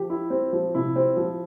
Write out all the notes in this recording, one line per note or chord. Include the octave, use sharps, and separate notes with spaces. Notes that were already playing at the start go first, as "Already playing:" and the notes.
Already playing: F3 G4
E4
C4
F3
C3 E4
C4
F3